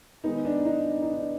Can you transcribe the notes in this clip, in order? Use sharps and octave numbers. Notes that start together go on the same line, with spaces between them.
D#3 G#3 B3 D#4
D4
D#4
D#4
D4